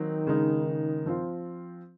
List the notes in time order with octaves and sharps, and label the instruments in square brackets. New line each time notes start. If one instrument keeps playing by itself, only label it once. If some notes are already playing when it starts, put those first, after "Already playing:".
Already playing: [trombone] D#3 [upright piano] F#3 C4 D#4
[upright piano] C#3 G#3 D#4
F3 C4 F4